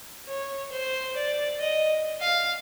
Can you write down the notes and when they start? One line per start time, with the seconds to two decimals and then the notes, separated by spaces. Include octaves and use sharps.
0.28 C#5
0.72 C5
1.17 D5
1.61 D#5
2.21 F5